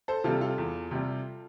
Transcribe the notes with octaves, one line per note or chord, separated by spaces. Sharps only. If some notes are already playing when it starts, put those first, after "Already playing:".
A4 C5
C3 G3 F4 A4
F4 A4
E2
C3 G3